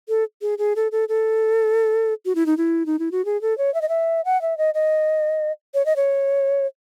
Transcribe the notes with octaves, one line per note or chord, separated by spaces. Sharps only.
A4
G#4
G#4
A4
A4
A4
F#4
E4
D#4
E4
D#4
E4
F#4
G#4
A4
C#5
E5
D#5
E5
F#5
E5
D#5
D#5
C#5
D#5
C#5